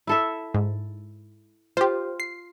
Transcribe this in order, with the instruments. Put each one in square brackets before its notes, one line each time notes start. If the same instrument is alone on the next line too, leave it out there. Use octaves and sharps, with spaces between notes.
[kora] E4 A4 E5
[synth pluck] G#2
[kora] F4 [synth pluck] G4 C5
[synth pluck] C7